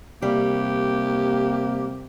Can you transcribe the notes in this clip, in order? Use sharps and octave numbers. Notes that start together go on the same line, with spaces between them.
C3 G3 A#3 G4